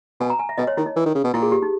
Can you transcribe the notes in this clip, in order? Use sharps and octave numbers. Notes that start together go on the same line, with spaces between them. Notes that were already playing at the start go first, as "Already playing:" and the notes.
B2 G#5
A#5
G#5
E5
B2 D#5
C#5
D#3 E4
D#4
E3
D#3
C#3
B2
A#2 E4
G#4
G4
D#4